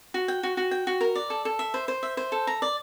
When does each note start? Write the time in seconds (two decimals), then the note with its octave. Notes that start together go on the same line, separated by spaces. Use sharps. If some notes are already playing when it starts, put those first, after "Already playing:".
0.14 F#4
0.28 G5
0.43 F#4
0.57 F#4
0.71 G5
0.87 F#4
1.01 A#4
1.15 D5
1.30 A4
1.45 A4
1.59 E5
1.74 C5
1.88 C5
2.03 E5
2.17 C5
2.32 A4
2.47 A#5
2.62 D5